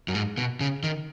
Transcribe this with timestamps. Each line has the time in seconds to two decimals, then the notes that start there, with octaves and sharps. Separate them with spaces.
0.08 F#2
0.15 G#2
0.38 B2
0.60 C#3
0.84 D#3